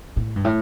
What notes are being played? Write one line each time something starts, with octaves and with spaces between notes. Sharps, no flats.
A2
G2
A2